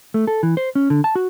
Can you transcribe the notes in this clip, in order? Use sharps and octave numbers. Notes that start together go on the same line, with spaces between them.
A3
A4
E3
C5
C#4
D3
A5
F#4